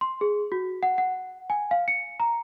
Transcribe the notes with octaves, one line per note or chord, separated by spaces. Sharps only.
C6
G#4
F#4
F#5
F#5
G#5
F5
C#7
A#5